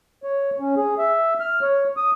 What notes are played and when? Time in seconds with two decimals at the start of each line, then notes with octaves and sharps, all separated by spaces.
0.23 C#5
0.60 C#4
0.77 G#4
0.98 E5
1.40 F6
1.62 C#5
1.97 D#6